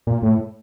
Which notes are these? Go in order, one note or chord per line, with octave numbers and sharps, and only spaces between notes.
A#2
A2